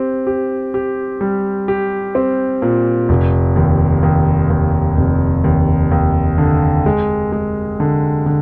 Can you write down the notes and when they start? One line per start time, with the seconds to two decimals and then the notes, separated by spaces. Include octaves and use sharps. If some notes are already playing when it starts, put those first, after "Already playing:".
Already playing: C4 G4
0.27 G4
0.74 G4
1.21 G3
1.68 G4
2.15 C4
2.62 A#2
3.09 F1
3.56 D#2
4.03 D#2
4.50 D#2
4.97 F1
5.44 D#2
5.91 D#2
6.38 D3
6.86 G#3
7.32 G#3
7.80 D3
8.26 D3